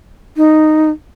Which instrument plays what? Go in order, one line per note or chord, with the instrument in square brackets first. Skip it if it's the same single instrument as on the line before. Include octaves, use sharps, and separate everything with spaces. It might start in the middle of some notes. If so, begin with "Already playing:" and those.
[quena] D#4